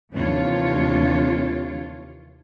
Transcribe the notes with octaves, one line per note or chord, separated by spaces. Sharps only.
D#2 C3 E3 D4 F4 C#5